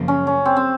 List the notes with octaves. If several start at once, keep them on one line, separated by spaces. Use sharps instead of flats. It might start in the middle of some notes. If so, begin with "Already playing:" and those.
Already playing: F#2 C#3 F3 A#3
C#4
C#4
C4
C4